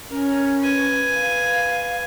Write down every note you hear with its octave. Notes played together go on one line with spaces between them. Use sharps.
C#4 A#4
B4 G#5
F5